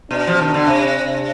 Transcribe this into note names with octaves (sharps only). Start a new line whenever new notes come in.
B2 D4
F3
D#3 D4
D3
C3 D4